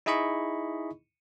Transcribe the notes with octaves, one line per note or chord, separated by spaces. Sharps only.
D#4 E4 G#4 D#5 B5 C#6